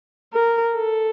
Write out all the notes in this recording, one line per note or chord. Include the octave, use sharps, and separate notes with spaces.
A#4
A4